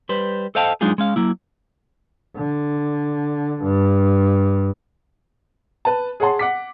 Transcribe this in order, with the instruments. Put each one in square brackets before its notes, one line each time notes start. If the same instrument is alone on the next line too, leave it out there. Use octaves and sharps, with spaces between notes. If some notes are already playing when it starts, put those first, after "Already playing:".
[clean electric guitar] G3 B4 C5
A4 C5 D#5 F5 G5 A5
F#3 G#3 D4 D#4 F4 G#4
G#3 C#4 F5
F#3 A#3 E4
[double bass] D3
G2
[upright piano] B4 A5
G#4 C#5 F#5 A5 C6
F#5 D6 B6